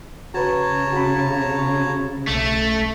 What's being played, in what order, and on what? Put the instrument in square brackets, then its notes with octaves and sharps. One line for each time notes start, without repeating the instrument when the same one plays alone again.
[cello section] C#3 [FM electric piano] F#4 B4 [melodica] C#5 A5 A#5
[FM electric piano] F#4 B5
[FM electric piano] B1 [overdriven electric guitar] A3